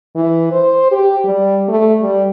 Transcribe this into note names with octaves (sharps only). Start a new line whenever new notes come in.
E3
C5
G4
G3
A3
G3